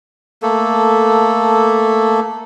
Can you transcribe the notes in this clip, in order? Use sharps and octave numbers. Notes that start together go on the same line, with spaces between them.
A3 A#3 A4